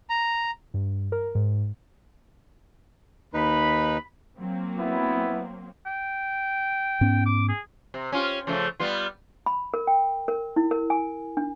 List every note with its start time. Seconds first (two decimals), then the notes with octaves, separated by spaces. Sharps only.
0.10 A#5
0.74 G2
1.12 A#4
1.35 G#2
3.34 D#2 D#4 B4 B5
4.39 F#3 A#3 C4
4.79 B3 E4
5.86 G5
7.01 G#2 B3 C#4
7.26 D6
7.49 G#4
7.94 C3
8.12 C#4 F4 G4
8.47 C#3 F3 A3
8.80 G3 B3 F4
9.46 B5
9.74 A#4
9.87 G5
10.28 A#4
10.56 E4
10.71 A#4
10.90 G#5
11.37 D4